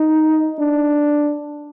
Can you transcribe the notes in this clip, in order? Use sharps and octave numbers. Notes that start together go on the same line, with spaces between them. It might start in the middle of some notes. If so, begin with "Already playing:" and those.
Already playing: D#4
D4